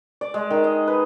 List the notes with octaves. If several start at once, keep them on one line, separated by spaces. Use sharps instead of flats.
D5
G#3
D#3
D#5
B4